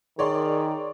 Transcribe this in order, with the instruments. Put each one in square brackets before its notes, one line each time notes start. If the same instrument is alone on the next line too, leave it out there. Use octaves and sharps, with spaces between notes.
[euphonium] D#3 [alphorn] G#4 [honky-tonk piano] C#5 D5 C6